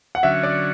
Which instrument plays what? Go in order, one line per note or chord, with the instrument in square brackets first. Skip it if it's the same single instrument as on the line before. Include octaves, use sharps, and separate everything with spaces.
[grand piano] F#5
[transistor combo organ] D3 F#3 C#4 F#4 [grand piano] E5
[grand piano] D5